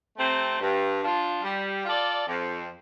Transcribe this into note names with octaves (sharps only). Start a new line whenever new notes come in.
C3 A3 C4
G2
F3 D4 F4
G3
F4 A4 D5
F2